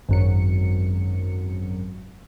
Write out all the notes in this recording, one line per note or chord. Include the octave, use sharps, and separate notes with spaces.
G#1 F#2 C#7